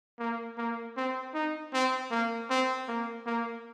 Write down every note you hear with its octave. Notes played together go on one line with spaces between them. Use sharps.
A#3
A#3
C4
D#4
C4
A#3
C4
A#3
A#3